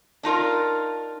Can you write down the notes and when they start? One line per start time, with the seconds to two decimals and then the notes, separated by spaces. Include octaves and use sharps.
0.23 D4 D#4 F4 A#4